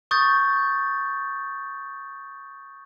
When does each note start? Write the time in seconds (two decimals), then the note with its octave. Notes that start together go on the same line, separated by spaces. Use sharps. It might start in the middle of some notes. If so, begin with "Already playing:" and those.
0.11 C#6 D#6 G6 A6